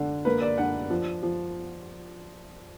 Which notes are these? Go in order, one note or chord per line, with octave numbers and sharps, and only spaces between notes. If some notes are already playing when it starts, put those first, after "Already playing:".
Already playing: D3 D4
A#3 B4
D5
D4 F#5
F3
F3